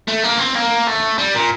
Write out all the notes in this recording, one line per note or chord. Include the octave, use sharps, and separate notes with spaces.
A3
A#3
C4
A#3
A3
G3
A#2